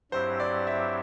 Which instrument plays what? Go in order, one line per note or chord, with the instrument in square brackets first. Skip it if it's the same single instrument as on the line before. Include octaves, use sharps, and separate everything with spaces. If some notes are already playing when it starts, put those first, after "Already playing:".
[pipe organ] G2 F#3 C4 E4 G4 [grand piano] C5
[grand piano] D5
E5